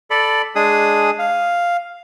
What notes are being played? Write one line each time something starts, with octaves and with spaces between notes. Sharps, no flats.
A4 D5 B5
G#3 D4 G#4 D#6
F5